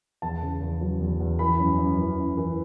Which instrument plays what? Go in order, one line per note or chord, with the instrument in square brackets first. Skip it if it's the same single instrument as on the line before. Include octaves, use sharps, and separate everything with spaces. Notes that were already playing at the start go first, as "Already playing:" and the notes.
[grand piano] E2 A5
C#3
E2
F#3
E2
E2
E3 B5
F#2
F#2
E3
F#2
E3